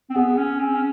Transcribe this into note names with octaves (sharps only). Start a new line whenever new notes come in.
C4
B3 G#4
C#4
C4
C#4